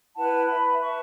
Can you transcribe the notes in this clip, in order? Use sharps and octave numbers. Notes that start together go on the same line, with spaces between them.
E4 B4 F#5 A5
B4 E5 B5
B4 E5 A5 C#6